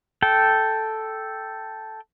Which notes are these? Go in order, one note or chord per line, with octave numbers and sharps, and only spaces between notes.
A4 G5